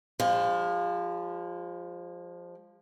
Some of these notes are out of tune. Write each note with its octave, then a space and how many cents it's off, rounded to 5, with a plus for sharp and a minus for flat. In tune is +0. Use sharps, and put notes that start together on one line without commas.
F3 +5 G#3 -40